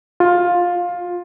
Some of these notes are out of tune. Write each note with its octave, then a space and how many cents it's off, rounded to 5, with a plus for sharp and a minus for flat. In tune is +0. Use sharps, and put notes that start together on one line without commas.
F4 +15